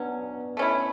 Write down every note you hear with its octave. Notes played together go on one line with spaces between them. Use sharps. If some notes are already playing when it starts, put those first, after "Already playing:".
Already playing: B2 F#3 B3 C#4 D4
A3 C#4 E4